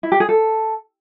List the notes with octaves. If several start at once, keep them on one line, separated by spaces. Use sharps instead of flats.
E4
G4
G#4
A4